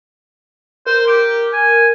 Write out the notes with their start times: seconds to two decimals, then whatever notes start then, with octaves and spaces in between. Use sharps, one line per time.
0.86 A#4 C5
1.08 G4
1.53 G#5